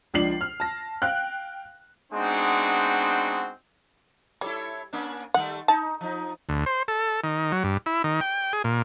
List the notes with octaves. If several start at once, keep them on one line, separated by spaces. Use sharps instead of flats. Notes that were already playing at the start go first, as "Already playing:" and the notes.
C#2 F3 D4 C7 F#7
F6
A5 A#6
F5 G5 F#6
G#3 B3 C4 D4 D#4 F#4
G3 E4 A4 C#5
A#3 C#4 D4
D#3 G3 A3 F#5
D#4 A5
F3 D#4
D2
C5
A4
D#3
F#3
G2
E4
D#3
G5
G#4
A#2